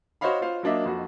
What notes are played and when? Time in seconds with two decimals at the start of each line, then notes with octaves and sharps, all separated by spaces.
0.21 F#4 C5 C#5 D#5 F5 B5
0.41 F4 C5 F5
0.63 F#3 A#3 D4 D#5 E5
0.86 F2 F#4